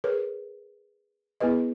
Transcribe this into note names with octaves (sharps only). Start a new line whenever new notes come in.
G#4 A#4 B4 C#5
B3 E4 G#4 B4 D#5